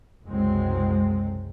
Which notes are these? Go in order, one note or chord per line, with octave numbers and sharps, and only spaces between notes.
F#1 C2 F#3 G#3 C4